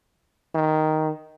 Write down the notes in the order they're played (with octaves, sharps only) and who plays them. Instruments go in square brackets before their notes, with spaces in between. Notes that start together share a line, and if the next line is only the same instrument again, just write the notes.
[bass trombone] D#3